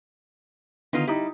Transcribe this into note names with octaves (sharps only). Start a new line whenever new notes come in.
D3 D#3 B3 D#4 F4
G3 D#4 E4 G4